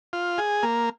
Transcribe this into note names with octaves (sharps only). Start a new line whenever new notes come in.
F4
G#4
A#3